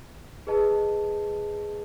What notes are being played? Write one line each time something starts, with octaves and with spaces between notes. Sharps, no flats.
G#4 B4 D#5 A5